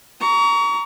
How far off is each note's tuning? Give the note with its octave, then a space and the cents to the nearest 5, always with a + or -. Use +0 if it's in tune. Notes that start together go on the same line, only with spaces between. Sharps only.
A#5 +0 C#6 +35